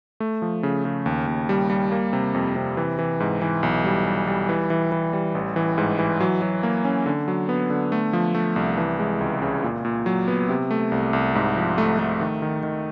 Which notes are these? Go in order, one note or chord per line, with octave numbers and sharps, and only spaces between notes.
A3
F3
C#3
C#3
D#2
D#2
G3
G3
A#3
C3
F2
C3
E3
E3
G#2
E3
B1
G3
G3
G3
E3
E3
E3
G3
A1
E3
G#2
E3
F#3
F#3
A#3
C#4
D3
F#3
B3
D3
A3
F3
A3
C2
E3
G#3
C#2
C#3
A#2
A#2
F#3
B3
C3
A3
C2
C2
G#2
F3
A3
A3
D#3
D#3
D#3